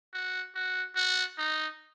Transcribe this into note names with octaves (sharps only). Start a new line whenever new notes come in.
F#4
F#4
F#4
D#4